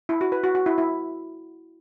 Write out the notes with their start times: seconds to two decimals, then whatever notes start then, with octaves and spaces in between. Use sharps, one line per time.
0.09 E4
0.21 F#4
0.32 B4
0.44 F#4
0.55 F#4
0.66 E4
0.78 E4